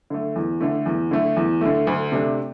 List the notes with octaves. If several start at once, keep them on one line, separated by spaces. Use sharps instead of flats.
D3 A3
E2
D3 A3
E2
D3 A3
E2
D3 A3
D2
C3 A3 D4